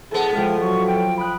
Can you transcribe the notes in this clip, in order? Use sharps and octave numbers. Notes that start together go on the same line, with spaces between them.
A2 B3 G#4 A4 A5
F3 G#3 F5 G5
F#3 C#6
G5
G5 B5 D#6 F#6